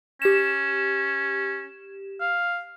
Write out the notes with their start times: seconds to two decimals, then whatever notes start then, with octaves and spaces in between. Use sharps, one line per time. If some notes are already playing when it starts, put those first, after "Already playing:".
0.22 C#4 G4 E7
2.21 F5